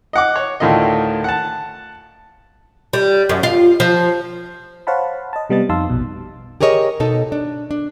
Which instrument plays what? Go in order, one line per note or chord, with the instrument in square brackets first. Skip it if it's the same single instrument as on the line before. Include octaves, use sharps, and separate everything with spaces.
[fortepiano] D#5 F#5 D6
C#5
D2 A2 D#3 F4 D#5
F#5 A5
[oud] G3
F#2
F4
F3
[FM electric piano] C5 C#5 F5 F#5 A5 B5
D#5 A5
C3 G3 B3 D#5 A6
F2 D#4 F5 A5 C6 E6
A#1 B2
[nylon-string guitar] G4 G#4 A#4 C#5 D#5
B2 D#4 A4
D4
D4